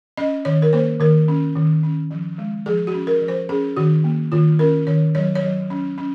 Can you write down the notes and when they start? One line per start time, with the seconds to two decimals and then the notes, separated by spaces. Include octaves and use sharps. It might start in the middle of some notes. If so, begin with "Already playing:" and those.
0.17 C#4 D#5
0.45 D#3 C#5
0.62 A#4
0.73 A#3 C5
1.00 D#3 A#4
1.28 C#4
1.55 D#3
1.83 C#4
2.11 F3
2.38 G#3
2.66 F3 G#4
2.87 F#4
2.94 C#4
3.07 A#4
3.21 F3
3.28 C5
3.49 C#4 G#4
3.77 D#3 F#4
4.04 A#3
4.32 D#3 F4
4.59 C#4 A#4
4.87 D#3 C#5
5.15 F#3 C#5
5.35 C#5
5.42 F#3
5.70 C#4
5.98 C#4